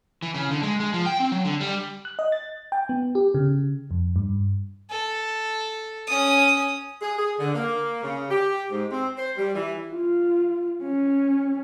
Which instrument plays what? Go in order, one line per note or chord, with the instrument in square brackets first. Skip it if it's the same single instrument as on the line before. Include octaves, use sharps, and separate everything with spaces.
[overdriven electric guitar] E3
C#3
D3
G#3
G#3
F3
G5
C4
F#3
D3
G3
[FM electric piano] F#6
D#5
A6
G5
B3
G4
C#3
F2
G2
[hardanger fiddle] A4
C#4 D#6
[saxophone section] G#4
G#4
D3
A#3
C#3
G4
G#2
C4
C5
G3
E3
[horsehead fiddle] F4
C#4